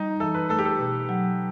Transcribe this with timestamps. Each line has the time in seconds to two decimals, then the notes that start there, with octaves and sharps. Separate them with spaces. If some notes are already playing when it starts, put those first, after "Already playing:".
Already playing: G3 D#4
0.20 E3 A4
0.34 B4
0.49 A3 A4
0.59 G4
0.65 A4
0.79 B2
1.09 F#3